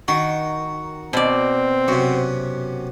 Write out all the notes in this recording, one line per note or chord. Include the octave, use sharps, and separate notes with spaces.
D#3 F#4
B2 C4 D5
F#2 C3 F#4